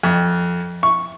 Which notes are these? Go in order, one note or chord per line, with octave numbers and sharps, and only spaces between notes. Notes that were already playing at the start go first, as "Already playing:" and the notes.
F2
C#6